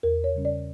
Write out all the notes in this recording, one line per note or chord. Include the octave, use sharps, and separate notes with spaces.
E2 A#4
C#5
C#3 G3 C#4
D5